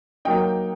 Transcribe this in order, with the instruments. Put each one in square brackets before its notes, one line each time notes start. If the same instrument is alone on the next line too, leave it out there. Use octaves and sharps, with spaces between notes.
[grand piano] F#3 A#3 D#4 G5